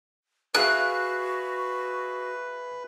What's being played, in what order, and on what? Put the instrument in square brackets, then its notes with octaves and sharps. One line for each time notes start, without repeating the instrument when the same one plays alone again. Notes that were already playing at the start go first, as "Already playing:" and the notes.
[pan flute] F#4 [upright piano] G#4 E5 F5 [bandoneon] B4 [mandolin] F#6